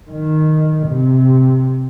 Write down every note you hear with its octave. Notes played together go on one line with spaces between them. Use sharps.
D#3
C3